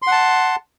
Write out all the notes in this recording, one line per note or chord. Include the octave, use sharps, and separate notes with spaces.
F#5 A5 C6